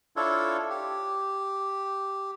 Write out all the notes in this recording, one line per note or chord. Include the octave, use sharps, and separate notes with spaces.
D4 E4 F4 A4 C#5
G4